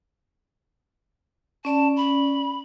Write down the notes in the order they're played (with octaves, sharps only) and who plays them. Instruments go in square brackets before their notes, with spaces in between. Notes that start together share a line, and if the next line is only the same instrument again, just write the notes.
[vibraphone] C#4 D5 [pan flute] A5
[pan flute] B5